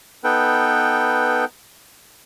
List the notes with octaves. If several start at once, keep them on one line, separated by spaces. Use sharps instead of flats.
B3 D#4 A4 B4 G5